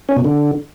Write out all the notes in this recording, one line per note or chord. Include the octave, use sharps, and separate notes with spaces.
C#4
B2
D3